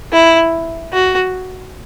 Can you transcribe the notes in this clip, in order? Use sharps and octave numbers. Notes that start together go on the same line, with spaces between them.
E4
F#4